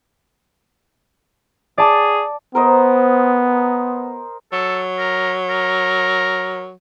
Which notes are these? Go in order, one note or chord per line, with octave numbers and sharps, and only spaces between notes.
G#4 D5 A5 D6
B3 A#4 C5 D#5
F#3 A4
A#4
A#4